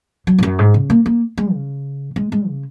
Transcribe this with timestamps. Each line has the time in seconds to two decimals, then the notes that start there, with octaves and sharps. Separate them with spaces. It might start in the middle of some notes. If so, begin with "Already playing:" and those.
0.27 F#3
0.38 G#2
0.43 F#2
0.59 G#2
0.74 C#3
0.90 A#3
1.06 A#3
1.38 G#3
1.53 C#3
2.16 G#3
2.32 G#3
2.48 C#3